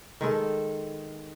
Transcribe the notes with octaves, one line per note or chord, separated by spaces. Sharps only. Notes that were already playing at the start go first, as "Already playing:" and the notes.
D#3 G#3 A4